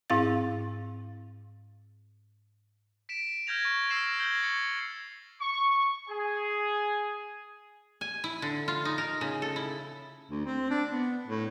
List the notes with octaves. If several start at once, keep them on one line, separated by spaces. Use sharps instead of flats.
G#2 C4 E4 F5 A6
B6 D7 E7
F6 G6 G#6 A#6 F7
C#6
E6 F6 A#6 C7 E7 F#7
F6 G6 G#6 A#6 F#7 G7
C#6 A6 C#7
C#6
G#4
G#5
E4
D3
F4
D#4
A#4
C#3
A4
E4
D2
C4
D4
B3
A2